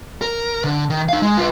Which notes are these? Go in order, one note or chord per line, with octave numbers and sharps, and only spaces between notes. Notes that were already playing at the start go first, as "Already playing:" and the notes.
A#4
D3
D#3
D#4 F5
G#3
F4 B4